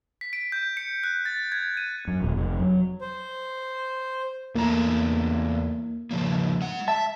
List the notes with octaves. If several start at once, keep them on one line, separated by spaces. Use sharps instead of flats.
B6
D7
G6
C#7
F#6
A6
G#6
D#7
F#2
D#1
F1
F#3
C5
E2 A3 A#3 A#5
C#3 F3 A#3
G#3 F#5
E5 A5